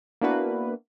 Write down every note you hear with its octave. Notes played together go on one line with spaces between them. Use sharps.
A#3 B3 D4 E4 F#4 B4